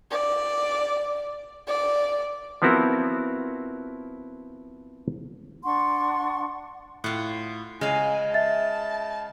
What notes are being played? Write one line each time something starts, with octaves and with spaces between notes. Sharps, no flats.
D5
D5
F3 B3 C4 E4 F#4 A#4
D4 F#5 C6 C#6
A2 F4 F#5
C#3 G#3 F5 G#5
E5 A5 A6